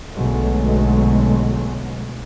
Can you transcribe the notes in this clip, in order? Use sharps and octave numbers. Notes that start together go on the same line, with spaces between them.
B1 B2 D3 F#3 G#3 A3